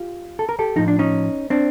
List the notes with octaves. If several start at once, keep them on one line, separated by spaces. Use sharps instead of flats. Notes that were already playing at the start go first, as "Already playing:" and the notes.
Already playing: F4 G4
A4
A#4
G4 A4
A2 F3 D#4
D4
C#4 D#4
C4 D4